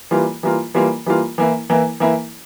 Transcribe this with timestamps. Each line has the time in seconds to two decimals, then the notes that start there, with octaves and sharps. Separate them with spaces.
0.11 E3 G3 A#3 F4
0.43 E3 G3 A#3 F4
0.75 E3 G3 A#3 F4
1.06 E3 G3 A#3 F4
1.38 E3 A#3 E4
1.70 E3 A#3 E4
2.00 E3 A#3 E4